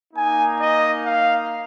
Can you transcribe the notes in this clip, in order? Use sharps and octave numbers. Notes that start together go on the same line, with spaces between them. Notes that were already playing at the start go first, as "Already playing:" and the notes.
A#3 D#4 G#5
D#5
F5